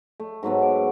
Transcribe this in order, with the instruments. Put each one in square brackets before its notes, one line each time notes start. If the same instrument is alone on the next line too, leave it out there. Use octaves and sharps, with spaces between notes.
[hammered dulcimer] A3
G#2 F#3 A3 B3
D6